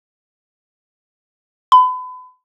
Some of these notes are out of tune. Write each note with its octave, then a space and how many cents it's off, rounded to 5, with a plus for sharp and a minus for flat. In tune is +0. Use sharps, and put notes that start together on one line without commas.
B5 +35